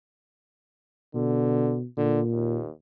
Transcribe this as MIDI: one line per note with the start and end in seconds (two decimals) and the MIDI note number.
1.15 1.84 47
1.15 1.77 50
1.98 2.61 46
1.98 2.21 50
2.32 2.71 39